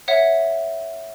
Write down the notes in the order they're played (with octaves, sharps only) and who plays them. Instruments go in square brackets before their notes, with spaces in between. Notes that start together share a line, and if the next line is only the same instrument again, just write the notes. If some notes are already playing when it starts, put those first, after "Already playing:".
[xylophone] C#5 E5 F#5